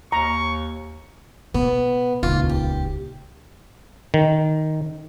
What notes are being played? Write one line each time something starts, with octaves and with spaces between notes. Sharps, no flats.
D#2 A#5 C#6
B2 B3
D#1 C#2 F4
G4
D#3